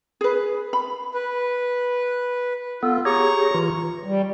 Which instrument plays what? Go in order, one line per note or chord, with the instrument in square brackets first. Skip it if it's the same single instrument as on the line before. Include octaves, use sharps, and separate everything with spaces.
[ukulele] G#4 B4
B5
[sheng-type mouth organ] B4
[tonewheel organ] B3 A4 [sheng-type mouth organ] F4
[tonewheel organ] G4 G#4 C#5 [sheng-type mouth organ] A#5 C#6
[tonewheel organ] E3 F4
[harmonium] G3